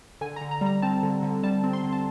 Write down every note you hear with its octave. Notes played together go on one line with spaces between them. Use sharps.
D3 G#5
A#5
D3
A#5
G3
A#5
C4 A5
D3
D3
G3 A5
C4
C6
D3
A5